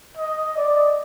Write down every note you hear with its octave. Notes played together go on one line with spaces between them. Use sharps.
D#5
D5